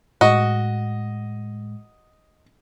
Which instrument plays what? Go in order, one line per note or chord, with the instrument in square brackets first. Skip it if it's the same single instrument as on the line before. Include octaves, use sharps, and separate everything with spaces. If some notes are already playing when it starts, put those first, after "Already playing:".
[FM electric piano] A2 G#3 [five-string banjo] F#4 [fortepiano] D#5